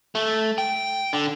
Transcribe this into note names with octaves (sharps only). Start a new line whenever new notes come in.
A3
G5
D3